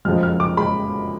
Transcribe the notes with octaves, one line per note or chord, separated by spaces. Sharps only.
F#1 F2 F3 G#3 F6
F6
D6
G#3 B5